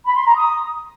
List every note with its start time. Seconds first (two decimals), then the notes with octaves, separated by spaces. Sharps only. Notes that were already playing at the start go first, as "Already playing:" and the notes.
0.06 B5
0.16 C6
0.25 A#5
0.35 D#6